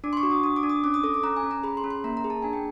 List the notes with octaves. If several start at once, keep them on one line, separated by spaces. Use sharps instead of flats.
D4 D6
C6
C#6
F#4
D#6
D4 D#6
D6
D4
D#6
C#4 D6
D#6
A4 D6
D6
C#4 A#5
G#5
C#4
A#5
G#4 B5
C6
C#4
C6
A#3 A#5
A#5
G#4
A5
D4 G#5
G5